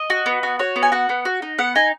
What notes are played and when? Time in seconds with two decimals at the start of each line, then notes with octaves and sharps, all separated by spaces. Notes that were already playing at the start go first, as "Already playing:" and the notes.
Already playing: D#5
0.10 F#4
0.26 B3
0.43 F#4
0.59 F#4 C#5
0.76 B3
0.83 G#5
0.92 F#4 F#5
1.09 B3
1.25 F#4
1.42 D#4
1.58 B3 F#5
1.75 D#4 G#5